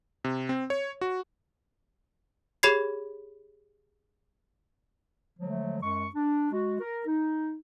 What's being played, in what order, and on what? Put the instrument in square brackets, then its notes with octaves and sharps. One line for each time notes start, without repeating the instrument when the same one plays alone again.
[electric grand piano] C3
C4
C#5
F#4
[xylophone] G4 G#4 C#5 B5 G#6 C7
[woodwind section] D3 F3 F#3 G#3 A3
F#2 G#3 C#6
D4
G#3 F#4
A#4
D#4